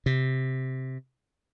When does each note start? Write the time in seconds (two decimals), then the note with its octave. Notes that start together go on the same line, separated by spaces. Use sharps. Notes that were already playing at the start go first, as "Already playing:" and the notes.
0.06 C3